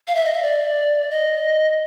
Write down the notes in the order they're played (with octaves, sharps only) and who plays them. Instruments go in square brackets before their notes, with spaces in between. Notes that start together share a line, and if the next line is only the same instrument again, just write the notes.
[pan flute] F5
E5
D#5
E5
D5
D#5